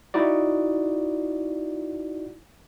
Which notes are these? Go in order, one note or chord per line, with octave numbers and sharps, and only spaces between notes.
D#4 E4 F#4 D5